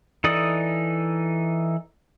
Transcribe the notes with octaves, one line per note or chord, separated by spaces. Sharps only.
E3 D#4 A4 D5 D#6